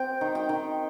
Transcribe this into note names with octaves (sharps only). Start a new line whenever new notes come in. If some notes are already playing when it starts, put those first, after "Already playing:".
Already playing: C4 G5
D#3
G5
D#3